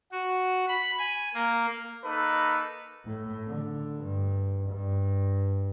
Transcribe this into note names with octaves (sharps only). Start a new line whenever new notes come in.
F#4
B5
G#5
A#3
A#3 D#4 A4 B4
A2
D3
G2
G2